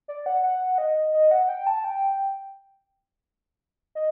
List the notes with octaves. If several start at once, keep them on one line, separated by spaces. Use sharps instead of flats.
D5
F#5
F#5
D#5
D#5
F#5
G5
A5
G5
D#5